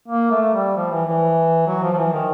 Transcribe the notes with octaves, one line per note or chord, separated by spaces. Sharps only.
A#3
A3
G3
F3
E3
E3
F#3
F3
F3
E3
D#3